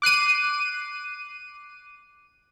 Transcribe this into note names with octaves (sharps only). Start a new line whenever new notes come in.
D6 F#6 C7 D#7